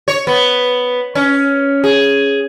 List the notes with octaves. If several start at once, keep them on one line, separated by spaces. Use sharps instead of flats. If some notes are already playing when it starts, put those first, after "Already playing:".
C#5
B3
C#4
G#4